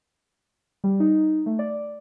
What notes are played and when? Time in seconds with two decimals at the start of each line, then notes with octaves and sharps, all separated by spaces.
0.84 G3
1.00 D#4
1.46 A3
1.59 D5